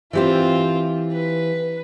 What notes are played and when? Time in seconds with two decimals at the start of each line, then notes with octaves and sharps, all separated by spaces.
0.13 E3 C4 F4 G4 C5
1.12 B4